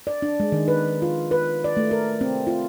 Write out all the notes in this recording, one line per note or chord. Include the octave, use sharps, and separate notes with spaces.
D5
D4
G#3
D#3
B4
F4
B4
D5
A3
A#4
C4
F4